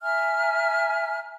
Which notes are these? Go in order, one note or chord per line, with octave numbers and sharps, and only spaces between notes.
E5 G#5 A#5 F6